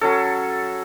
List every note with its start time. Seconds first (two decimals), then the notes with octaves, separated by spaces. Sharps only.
0.01 F#3 C#4 A4